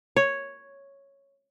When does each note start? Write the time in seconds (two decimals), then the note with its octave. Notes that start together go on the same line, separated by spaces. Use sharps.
0.16 C#5